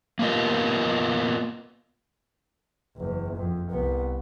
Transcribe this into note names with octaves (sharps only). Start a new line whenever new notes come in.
A#3 B3 F4 A#4 D#5
F#1 E2
F2
C2 B3